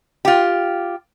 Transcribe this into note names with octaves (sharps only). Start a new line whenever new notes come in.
F4 G4